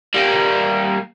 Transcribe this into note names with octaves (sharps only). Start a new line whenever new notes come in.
G3 A#3